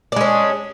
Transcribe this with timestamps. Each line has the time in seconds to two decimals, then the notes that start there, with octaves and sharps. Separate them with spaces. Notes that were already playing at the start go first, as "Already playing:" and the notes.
0.12 D4
0.16 G#3
0.21 C#4